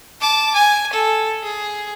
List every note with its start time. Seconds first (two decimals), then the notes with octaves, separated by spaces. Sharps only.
0.21 A5 D6
0.55 G#5
0.93 A4
1.43 G#4